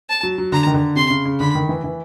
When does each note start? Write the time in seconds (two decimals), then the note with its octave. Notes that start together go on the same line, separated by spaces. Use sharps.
0.09 A5
0.23 F#3
0.38 F#3
0.52 D3 A#5
0.67 D#3
0.74 D3
0.96 C3 C6
1.10 C#3
1.25 C#3
1.40 D3 B5
1.55 D#3
1.69 E3
1.84 E3